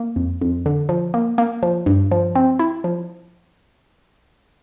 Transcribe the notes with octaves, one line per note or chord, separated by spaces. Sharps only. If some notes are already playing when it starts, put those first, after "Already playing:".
Already playing: A#3
F2
F2
D3
F3
A#3
A#3
F3
G2
F3
C4
E4
F3